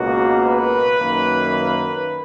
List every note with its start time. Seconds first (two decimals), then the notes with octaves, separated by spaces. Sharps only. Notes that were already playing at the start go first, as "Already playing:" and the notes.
Already playing: C#2 B2 A#3 F#4
0.44 B4
0.99 F#2 D#3 A#3